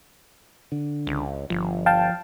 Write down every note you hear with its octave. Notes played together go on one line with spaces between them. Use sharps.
D3
C#2
G1 F3
F5 G5 A5